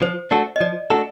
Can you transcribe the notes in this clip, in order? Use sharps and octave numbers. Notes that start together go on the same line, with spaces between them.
F3 C5
A3 D4 F#4 A4
D#5
F3 D5
A3 D4 F#4 A4